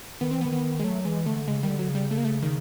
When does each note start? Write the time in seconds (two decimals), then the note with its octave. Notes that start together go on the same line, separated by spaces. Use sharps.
0.21 D#3 B3
0.31 E3 C4
0.41 B3
0.45 D#3
0.52 B3
0.80 G#3
0.84 F#3 A3
1.05 E3 G#3
1.26 D3 A3
1.47 C#3 G#3
1.63 D#3 G3
1.69 D3
1.79 F#3
1.89 C#3
1.95 G3
2.11 A3
2.18 A#3
2.25 A3
2.42 D#3